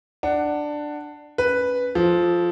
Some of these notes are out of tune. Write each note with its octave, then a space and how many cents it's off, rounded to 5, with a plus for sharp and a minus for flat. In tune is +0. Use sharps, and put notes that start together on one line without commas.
D4 +10 F#5 +10
C#4 +0 B4 +0
F3 +0 A4 -30